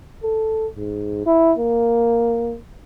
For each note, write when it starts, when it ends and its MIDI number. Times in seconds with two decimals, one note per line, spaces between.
0.23 0.67 69
0.77 1.25 44
1.26 1.53 64
1.59 2.56 58